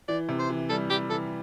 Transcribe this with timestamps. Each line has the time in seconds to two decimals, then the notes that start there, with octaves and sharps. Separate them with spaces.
0.08 E3 D5
0.29 C3
0.39 C5
0.50 E3
0.69 G3 A4
0.90 G3 G4
1.10 E3 A4